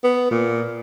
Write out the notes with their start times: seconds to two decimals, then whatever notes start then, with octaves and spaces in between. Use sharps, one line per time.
0.04 B3
0.31 A#2